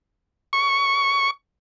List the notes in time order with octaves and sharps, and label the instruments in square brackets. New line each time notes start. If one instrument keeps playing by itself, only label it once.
[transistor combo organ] C#6